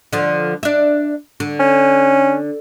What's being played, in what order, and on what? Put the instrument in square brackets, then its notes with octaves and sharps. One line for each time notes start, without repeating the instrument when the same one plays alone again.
[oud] D3 F3
D4 E5
D3
[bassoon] C#4